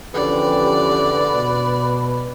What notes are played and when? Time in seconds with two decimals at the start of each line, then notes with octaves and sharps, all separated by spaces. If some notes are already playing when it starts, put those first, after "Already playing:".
0.14 E2 D3 F3 C#4 G4 B4 D5
1.32 B2